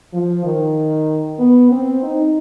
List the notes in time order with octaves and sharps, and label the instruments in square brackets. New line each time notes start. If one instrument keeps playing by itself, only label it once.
[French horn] F3
D#3
B3
C4
D#4